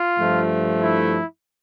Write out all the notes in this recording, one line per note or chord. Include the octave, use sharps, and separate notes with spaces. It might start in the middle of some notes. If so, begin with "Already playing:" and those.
Already playing: F4
G2 F3 A3
E4